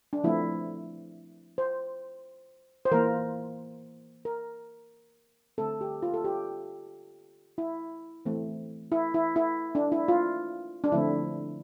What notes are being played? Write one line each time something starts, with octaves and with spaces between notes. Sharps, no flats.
D4
F3 A3 C4 E4
C5
C5
E3 A#3 A#4
A#4
D3 A3 C4 A4
G4
F4
A4
G4
E4
E3 A3 C4
E4
E4
E4
D4
E4
F4
D4
D3 F3 A3 C4 E4